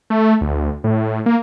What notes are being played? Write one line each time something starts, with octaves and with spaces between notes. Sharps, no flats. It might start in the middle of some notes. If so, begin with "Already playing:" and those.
A3
D2
A2
A#3